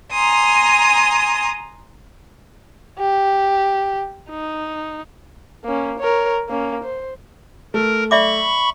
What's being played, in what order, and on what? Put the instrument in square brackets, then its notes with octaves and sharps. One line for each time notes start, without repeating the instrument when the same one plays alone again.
[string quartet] G#5 A#5 C6 D#6
[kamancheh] G4
D#4
A#3 C#4
A#4 C#5
A#3 C#4
C5
[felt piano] A3 [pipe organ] A#4
[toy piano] D5 E5 D6 [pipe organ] B5 C#6